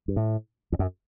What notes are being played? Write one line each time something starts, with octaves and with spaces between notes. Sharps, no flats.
G2
A2
E2
F#2